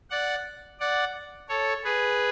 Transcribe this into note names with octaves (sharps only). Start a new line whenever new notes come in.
D5 F#5
D5 F#5
A4 C#5
G#4 B4